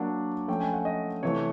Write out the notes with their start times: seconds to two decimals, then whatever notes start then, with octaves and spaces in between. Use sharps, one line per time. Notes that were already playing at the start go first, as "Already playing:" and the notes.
Already playing: F#3 A#3 D4 F#5
0.48 F3 A3 C#4 G5
0.60 G#5
0.73 F#5
0.85 D#5
1.23 C3 E3 A3 C#5